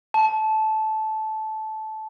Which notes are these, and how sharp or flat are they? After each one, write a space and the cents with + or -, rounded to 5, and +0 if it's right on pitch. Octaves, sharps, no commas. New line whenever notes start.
A5 -15